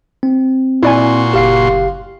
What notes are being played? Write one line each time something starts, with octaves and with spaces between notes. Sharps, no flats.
C4
A#2 E4 F#4 D5 G#5 C6
F#1 G4 F5 C7